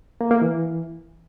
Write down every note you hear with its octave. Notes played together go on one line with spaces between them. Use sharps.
A#3
A#3
E3